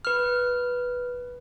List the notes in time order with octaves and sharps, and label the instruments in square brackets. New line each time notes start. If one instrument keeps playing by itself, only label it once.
[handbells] B4 F6